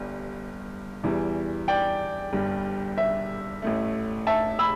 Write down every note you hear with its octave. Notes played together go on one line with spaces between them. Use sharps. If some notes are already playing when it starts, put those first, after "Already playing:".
Already playing: G1 G2 G3
E2 E3 G3
D5 G5
G1 G2 G3
E5
A1 A2 A3
E5 A5
B5 E6